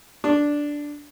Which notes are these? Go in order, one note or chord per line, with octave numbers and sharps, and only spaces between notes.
D4